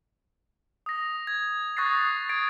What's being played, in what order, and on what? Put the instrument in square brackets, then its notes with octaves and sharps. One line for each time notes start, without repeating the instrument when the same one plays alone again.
[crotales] D#6 A#6
G#6
C#6 D#6 F#6 A6 A#6 C7
G#6 A6 C7 D7